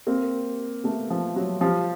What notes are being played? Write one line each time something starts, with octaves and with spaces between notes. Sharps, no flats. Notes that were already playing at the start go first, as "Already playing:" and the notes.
A#3 C4
A3 B3
F3
F#3
F3 G3